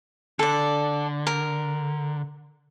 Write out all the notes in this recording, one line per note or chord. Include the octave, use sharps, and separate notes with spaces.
D3 A4 D5
A#4